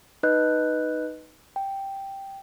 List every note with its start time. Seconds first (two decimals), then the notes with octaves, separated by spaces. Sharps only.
0.23 D#4 B4 D#5 F#6 G6
1.56 G5